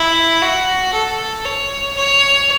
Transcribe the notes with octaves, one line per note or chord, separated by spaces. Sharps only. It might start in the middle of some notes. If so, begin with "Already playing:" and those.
Already playing: E4
F#4
A4
C#5
C#5